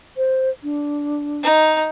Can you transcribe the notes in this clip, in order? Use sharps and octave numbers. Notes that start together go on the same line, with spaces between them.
C5
D4
D#4